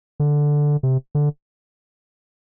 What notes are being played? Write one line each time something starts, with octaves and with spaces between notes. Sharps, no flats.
D3
C3
D3